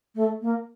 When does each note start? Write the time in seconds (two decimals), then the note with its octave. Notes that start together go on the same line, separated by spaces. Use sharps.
0.15 A3
0.41 A#3